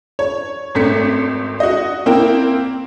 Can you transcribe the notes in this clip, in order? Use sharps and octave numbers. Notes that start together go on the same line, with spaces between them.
C#5
G#1 A3 C4 B6 C#7
F#4 D#5
A#3 C4 E4 A#4 G5